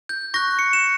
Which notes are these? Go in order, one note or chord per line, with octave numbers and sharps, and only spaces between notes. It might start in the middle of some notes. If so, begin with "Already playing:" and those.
G6
C#6 F#6 A#6
C#7
E7